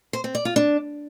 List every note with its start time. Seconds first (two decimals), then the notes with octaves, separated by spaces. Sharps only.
0.13 C5
0.24 C4
0.35 D5
0.45 F4
0.56 D4